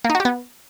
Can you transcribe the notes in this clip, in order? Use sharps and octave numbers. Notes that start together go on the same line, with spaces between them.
A#3
D#4
F#4
G4
B3